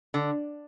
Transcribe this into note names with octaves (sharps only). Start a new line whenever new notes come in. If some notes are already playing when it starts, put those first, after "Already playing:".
D3